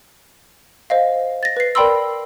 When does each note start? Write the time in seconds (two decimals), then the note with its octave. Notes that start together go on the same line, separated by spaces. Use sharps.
0.90 C5 D#5 F5
1.43 A6 A#6
1.57 B4 C7
1.75 A#4 D5 G5 B5 C6 E6